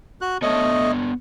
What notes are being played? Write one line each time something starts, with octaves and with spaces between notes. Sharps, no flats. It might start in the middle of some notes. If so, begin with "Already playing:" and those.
F#4 F#6
A3 B3 D4 C#5 D#5